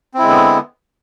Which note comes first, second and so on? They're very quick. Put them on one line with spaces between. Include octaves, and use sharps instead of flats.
C4 E4 G#3 D3 B3